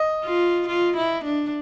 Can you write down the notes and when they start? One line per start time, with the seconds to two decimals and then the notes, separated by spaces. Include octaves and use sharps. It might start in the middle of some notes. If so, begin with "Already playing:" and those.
Already playing: D#5
0.25 F4
0.68 F4
0.97 E4
1.25 D4